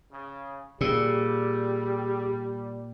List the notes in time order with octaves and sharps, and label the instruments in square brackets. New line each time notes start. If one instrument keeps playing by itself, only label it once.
[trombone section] C#3
[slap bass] A#2 [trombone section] G3 [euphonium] G4 [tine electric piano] G#4 D5 E6